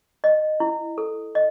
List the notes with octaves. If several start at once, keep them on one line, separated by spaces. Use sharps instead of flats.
D#5
E4
A4
D#5